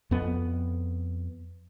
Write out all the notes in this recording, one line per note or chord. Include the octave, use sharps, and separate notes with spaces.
F2 B3